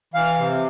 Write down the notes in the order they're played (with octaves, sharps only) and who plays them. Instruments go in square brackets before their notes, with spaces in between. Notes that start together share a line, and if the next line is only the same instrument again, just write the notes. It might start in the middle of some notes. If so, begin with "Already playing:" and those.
[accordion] E3 F5
C3